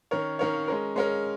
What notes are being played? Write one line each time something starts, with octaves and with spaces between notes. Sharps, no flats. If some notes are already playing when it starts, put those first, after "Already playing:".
D#3 C#4 A#4 C#5
D#3 C#4 A#4 C#5
G#3 C#4 A#4
G#3 C#4 A#4